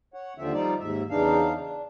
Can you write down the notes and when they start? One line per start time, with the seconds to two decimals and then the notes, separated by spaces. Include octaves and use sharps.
0.14 C#5 F#5
0.38 D#2 D3 F3 C4 E5
0.53 F3 G3 D#4 D5
0.79 D#2 G#2 E5
1.10 E2 C#3 E3 D4 D#4 F5
1.57 D4